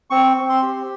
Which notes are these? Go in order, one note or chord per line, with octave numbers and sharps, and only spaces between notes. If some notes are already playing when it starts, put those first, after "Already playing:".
C4 C#6
C4
C6
G4